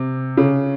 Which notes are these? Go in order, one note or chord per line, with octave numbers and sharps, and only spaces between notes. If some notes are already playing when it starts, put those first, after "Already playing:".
Already playing: C3
C#3